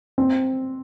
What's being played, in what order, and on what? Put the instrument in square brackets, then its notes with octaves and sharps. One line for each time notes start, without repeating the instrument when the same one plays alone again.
[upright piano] C4